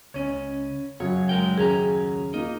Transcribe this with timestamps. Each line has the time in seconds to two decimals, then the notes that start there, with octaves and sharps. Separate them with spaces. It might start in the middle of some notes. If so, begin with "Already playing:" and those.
0.14 C#2 C#4 C#5
1.00 F#2 C#3 F#3 C#5
1.29 G#3 A#4 G5
1.58 D#2 C#4 G#4 A#5
2.34 A#3 D#4 F4